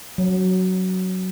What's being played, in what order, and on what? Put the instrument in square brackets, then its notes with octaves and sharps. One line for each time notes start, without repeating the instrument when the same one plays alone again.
[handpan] F#3